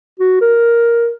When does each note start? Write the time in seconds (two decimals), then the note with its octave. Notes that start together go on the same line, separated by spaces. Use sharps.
0.20 F#4
0.41 A#4